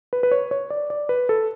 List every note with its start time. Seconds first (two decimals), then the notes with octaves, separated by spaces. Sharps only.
0.13 B4
0.23 B4
0.31 C#5
0.51 C#5
0.70 D5
0.90 D5
1.09 B4
1.29 A4